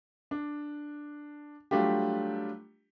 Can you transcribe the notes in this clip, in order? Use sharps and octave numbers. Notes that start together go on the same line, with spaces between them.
D4
F#3 G3 A3 D4 F4 G4